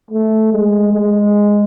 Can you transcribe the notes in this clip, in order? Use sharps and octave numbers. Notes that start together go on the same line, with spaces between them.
A3
G#3
G#3